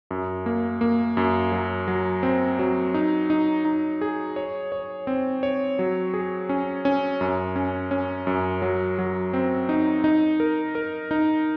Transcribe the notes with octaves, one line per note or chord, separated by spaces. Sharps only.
F#2
A#3
A#3
F#2
F#3
F#3
C4
F#3
D#4
D#4
D#4
G#4
C#5
C#5
C4
C#5
F#3
G#4
C#4
C#4
F#2
C#4
C#4
F#2
F#3
F#3
C4
D#4
D#4
A#4
A#4
D#4